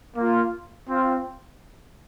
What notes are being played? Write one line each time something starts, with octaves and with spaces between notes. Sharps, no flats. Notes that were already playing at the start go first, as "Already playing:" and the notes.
A#3
F4
C4 F4